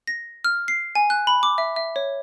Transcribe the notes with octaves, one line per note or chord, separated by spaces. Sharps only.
A#6
F6
C7
G#5
F#6
B5
D6
E5
E5
C#5